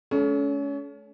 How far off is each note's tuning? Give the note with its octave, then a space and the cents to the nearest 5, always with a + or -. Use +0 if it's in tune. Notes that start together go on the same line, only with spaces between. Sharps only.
A3 -45 C#4 +30 A4 -30